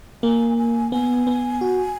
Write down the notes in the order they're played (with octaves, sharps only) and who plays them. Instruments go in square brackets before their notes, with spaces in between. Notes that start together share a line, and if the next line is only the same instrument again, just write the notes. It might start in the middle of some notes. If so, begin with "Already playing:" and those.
[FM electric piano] A#3 [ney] G#5
[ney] G#5
[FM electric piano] B3 [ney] G#5
[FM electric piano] B3
F#4